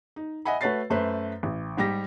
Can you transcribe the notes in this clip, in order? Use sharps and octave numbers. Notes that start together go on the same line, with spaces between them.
D#4
D#5 E5 F#5 G#5 B5
A3 F#4 B4 C#5 A6 C7
F#2 A3 B4 C5
A1
G#2 G3 G4 A#6